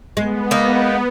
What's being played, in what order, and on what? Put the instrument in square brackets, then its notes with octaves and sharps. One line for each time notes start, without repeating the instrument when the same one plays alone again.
[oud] G#3 [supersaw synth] B3
[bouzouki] A#3 D#4